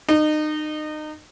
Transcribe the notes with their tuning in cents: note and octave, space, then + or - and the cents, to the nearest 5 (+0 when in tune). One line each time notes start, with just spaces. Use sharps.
D#4 -30